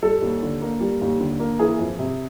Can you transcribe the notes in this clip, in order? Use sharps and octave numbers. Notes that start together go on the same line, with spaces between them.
G3 A4
D#2
D3
A#3
G3
D#2
D3
A#3
E3 G#4
F2
C3